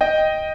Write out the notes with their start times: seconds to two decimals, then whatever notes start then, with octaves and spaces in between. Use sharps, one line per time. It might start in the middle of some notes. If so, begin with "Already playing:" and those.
0.01 D#5 G5